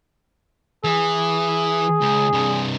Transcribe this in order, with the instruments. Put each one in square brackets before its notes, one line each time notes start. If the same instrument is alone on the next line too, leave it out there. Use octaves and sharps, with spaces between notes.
[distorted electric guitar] E3 [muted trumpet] G#4
[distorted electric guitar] C#2
G2 C3